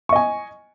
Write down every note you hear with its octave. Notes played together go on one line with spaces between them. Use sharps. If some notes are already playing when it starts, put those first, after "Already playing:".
D#5 G#5 C#6